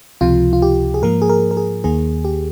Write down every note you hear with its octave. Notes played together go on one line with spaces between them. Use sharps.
C#2 C3 F3 F4
F4
G4
G#4
G#2 F3 A#3 A#4
G#4
A#4
A#4
G#4
D#2 D#3 A#3 G#4
G4